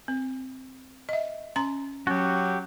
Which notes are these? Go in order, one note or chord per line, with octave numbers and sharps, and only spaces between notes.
C4
D#5 E5
C#4 A#5 C6
F#3 C#4 F#4 G4